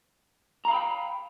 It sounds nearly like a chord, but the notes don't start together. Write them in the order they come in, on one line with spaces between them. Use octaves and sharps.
A#5 F5 B5 G5